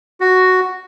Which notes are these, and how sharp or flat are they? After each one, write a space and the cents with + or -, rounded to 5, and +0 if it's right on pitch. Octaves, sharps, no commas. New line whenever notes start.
F#4 +0